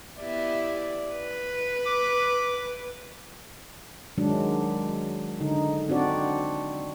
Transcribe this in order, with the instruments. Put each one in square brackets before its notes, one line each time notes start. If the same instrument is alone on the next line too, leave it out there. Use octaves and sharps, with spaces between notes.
[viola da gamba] B3 E4 G4 [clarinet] D5
[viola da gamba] B4
[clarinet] D6
[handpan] D#3 F#3 G#3 D4
D3 D#4
C4 D4 F#4 D5